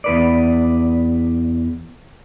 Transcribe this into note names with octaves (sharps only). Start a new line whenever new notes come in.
E2 B4 D5